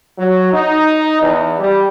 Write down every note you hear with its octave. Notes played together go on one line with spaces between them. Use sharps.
F#3
D#4
E2
G3